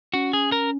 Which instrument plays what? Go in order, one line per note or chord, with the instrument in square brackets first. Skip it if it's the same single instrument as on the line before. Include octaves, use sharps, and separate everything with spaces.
[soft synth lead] C#4 [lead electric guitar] F#4
[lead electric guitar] G#4
A#4